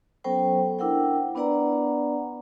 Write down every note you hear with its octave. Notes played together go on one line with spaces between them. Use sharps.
F#3 B3 C#4 A4 C5 G5
D4 E4 A#4 F#5 G5
B3 D4 B4 D5 F#5 A#5